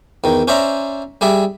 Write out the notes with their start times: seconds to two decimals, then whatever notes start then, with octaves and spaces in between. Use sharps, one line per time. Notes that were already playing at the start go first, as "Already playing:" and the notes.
0.24 E2 D#3
0.48 C#4 C5 D5 E5 A#5
1.21 G3 G#4 D5 E5